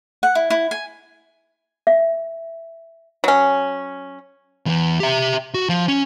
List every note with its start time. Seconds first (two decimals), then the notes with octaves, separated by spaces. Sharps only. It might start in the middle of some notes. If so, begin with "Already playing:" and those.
0.23 F#5
0.35 E4
0.50 E4
0.71 G#5
1.87 E5
3.24 F#3 C#4
4.66 E2 E3
5.00 G4 E5
5.54 F#4
5.69 F3
5.88 C#4